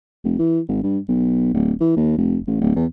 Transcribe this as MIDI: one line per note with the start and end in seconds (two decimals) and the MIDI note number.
0.24 0.38 29
0.39 0.60 52
0.68 0.83 32
0.83 0.98 43
1.09 1.50 35
1.54 1.72 26
1.80 1.94 52
1.97 2.13 39
2.18 2.39 29
2.47 2.59 33
2.61 2.71 26
2.76 2.86 40